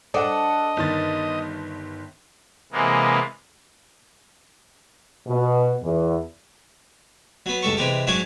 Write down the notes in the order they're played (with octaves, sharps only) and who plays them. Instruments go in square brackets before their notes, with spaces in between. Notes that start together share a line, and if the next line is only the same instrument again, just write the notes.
[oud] D4 [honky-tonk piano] A4 F#5 [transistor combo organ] D#5
[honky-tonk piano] G1 D#3 A6
[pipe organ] C3 E3 G#3 A#3 B3
[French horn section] B2
E2
[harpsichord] F#3 B3
C#2 G2 A4 C#6
C3 E3 G#3 G4
G#2 F#3 D4 F#4 C#5 G#5